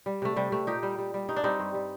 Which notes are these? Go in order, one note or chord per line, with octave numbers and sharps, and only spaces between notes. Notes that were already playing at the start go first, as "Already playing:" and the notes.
G3
C3 A3
C3 G3
C3 A3
A#2 D#4 G4
G3
G3
G3
G2 D#4
D4
G3 C4 D#4
G2
G3